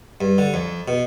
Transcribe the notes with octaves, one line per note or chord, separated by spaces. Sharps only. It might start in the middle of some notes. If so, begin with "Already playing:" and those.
G2
D3
F2
B2